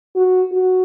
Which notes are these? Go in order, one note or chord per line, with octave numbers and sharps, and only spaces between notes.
F#4
F#4